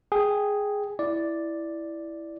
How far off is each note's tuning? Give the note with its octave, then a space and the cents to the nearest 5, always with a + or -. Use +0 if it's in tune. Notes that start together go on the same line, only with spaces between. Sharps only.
G#4 +0 G5 +0
E4 +0 D5 +0